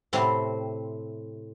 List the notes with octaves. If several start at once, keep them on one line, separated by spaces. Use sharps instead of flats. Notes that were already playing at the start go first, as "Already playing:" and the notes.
A2 C3 C4